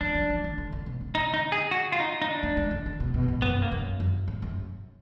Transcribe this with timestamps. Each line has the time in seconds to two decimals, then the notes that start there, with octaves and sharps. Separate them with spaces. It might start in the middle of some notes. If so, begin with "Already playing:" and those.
0.01 F3 D4
0.15 F#3
0.30 F3
0.44 D#3
0.58 D3
0.72 D3
0.86 B2
1.01 D3
1.15 D#4
1.34 D#4
1.52 G#4
1.71 F#4
1.92 F4
2.00 D#4
2.22 D#4
2.28 D4
2.43 A#3
2.57 G#3
2.71 D3
2.86 D3
3.00 B2
3.14 B2
3.28 G#2
3.42 F#2 B3
3.62 A#3
3.72 F#2
4.00 F#2
4.28 G#2
4.42 F#2